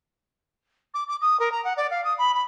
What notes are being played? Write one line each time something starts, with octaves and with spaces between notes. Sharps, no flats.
D6
D6
D#6
A#4
A#5
F#5
D5
F5
D#6
B5
B5